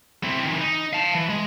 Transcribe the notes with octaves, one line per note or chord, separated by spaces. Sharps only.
C4 E4
D#3 E3
D#4
F5 A5
E3
G#3